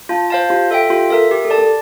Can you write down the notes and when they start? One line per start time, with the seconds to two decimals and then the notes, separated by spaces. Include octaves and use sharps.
0.09 F4 F5 A5
0.30 C5 F5 A5
0.50 F4 G4
0.71 A4 E5 G5
0.90 F4 G4
1.10 A4 A#4 E5
1.31 G4
1.44 A4
1.50 A#4 D5 A5
1.58 A4